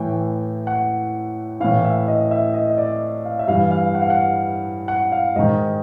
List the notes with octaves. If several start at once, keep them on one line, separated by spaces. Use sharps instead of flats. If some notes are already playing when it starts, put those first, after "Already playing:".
Already playing: A2 E3 G5
F#5
A2 E3 F5
E5
D#5
E5
D#5
D#5
D5
F5
E5
G2 E3 F5
F5
F#5
F5
F#5
F#5
F5
G#2 D#3 D#5